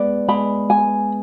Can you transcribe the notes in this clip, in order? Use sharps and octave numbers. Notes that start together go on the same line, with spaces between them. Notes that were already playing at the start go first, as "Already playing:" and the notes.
Already playing: G#3 B3 G#4 B4 D5
G#3 G#4 B5
G#5